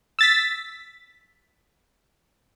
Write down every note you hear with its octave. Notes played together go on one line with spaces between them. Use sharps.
E6 A6 B6